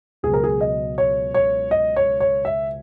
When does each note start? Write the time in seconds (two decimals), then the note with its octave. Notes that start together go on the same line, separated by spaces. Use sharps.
0.23 C#2 B2 F#3 G#4
0.34 A#4
0.44 G#4
0.61 D#5
0.98 C#5
1.34 C#5
1.71 D#5
1.96 C#5
2.20 C#5
2.45 E5